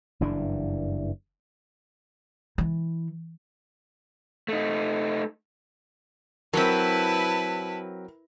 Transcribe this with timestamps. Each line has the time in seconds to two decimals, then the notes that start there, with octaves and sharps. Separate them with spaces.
0.21 F#1 G2 E3 D4
2.58 E3
4.49 A3 D#4
6.53 F#3 C4 E4 A#4 B4 A5